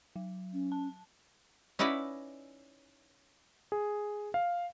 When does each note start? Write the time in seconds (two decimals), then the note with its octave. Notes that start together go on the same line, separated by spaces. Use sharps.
0.16 F#3
0.53 C#4
0.72 A5
1.79 C#4 D#4 E4 B4 D5 F#5
3.72 G#4
4.34 F5